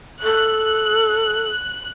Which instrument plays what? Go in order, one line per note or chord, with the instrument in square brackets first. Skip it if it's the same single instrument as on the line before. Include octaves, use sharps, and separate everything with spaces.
[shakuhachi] A4 [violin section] F#6